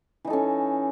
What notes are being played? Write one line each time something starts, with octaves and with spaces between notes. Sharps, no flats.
E3 C#4 D#4 A4